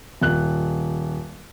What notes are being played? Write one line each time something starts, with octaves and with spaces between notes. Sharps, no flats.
D#1 F#6